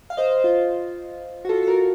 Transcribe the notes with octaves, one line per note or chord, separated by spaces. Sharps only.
F5
C5 D#5
F4
F#4
F4 A4
A4
F#4 A#4